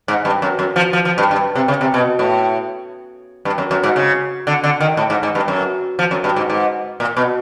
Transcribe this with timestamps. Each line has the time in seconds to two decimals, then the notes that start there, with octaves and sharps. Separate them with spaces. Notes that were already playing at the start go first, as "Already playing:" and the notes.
0.08 G#2
0.25 G2
0.42 F#2
0.59 F#2
0.76 F3
0.93 F3
1.05 F3
1.18 G2
1.31 G2
1.55 C3
1.68 C#3
1.81 C3
1.94 B2
2.19 A2
3.45 G2
3.58 F#2
3.71 F#2
3.83 G#2
3.96 C#3
4.47 D3
4.64 D3
4.81 D#3
4.97 A2
5.10 G#2
5.23 G#2
5.35 G2
5.48 F#2
5.99 F3
6.11 F#2
6.24 G2
6.36 G#2
6.50 G#2
7.00 A#2
7.17 B2